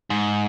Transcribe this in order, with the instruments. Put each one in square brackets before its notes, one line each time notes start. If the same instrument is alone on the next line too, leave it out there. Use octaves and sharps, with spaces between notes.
[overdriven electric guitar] G#2